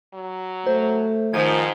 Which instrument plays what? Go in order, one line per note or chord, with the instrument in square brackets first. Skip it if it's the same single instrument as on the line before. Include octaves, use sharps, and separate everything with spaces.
[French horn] F#3
[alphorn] A3 [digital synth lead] C5
[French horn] G#2 [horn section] D#3 F3 [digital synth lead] G#6